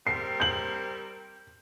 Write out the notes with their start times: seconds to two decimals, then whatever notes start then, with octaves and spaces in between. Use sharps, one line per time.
0.07 G3 C4 A#4 C7
0.40 G6 F#7